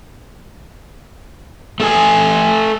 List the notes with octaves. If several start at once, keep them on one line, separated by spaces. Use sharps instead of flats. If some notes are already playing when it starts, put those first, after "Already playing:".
A3 A4 G#5